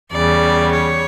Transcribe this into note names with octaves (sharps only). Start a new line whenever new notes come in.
E2 C#3 G3 D5
C#5